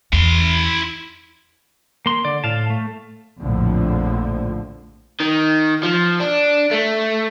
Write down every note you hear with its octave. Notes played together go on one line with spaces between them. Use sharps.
E2 E4 C6
A#3 C6
D3 D5
A2 F5 A5
A3
A#1 F2 A2 D3 F3
D#3
F3
D4
A3